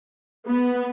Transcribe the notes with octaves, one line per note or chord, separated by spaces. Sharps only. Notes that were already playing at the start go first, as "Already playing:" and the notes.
B3